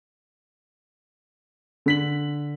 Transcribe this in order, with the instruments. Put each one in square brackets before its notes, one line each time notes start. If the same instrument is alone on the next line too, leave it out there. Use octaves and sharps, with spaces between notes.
[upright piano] D3 B6 F#7